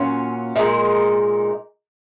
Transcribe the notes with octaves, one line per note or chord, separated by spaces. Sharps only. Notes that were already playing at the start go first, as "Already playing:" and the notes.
Already playing: A#2 F#3 C#4 F4
A#2 G#3 D#4 A#4